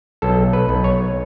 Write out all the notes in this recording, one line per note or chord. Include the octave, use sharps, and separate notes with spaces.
B1 A4
B4
B1
C#5